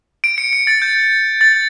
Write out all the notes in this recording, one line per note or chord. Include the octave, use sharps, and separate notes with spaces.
D7
C#7
C#7
A6
G6
A6